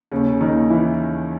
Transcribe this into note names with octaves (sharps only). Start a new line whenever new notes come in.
D#2 C#3 C#4
C#3
D#3 D#4
D#2
E3 E4